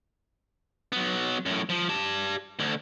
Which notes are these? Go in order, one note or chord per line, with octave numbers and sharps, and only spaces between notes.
F#3 B3
F#2 A2
F3
G4 A5
D2 D3